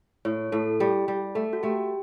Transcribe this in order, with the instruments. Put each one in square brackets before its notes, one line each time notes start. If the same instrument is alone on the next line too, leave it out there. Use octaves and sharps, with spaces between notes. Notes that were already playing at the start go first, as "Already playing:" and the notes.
[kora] A2 [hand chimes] C#5
[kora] A2 [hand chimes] A4
[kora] G3 [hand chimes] G4
[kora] G3
[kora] A3 [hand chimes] A4
[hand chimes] F#4
[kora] A3 [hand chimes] G4